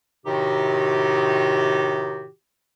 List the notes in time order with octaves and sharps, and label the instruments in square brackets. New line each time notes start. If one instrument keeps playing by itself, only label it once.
[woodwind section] A2 C3 D#3 D#4 F#4 G4